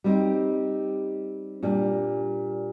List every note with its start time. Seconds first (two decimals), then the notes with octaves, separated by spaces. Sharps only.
0.04 G3 C4 D#4 G4
1.63 A#2 G3 D4